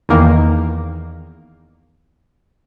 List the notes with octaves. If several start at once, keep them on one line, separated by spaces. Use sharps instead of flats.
E2 D#3 A#3